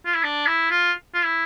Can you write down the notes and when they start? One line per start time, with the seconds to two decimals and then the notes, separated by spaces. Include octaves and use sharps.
0.06 F4
0.15 E4
0.23 D4
0.46 E4
0.70 F4
1.14 F4
1.25 E4